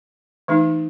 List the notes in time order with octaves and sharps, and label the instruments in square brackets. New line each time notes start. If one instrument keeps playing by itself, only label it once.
[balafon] E3 A3 D#4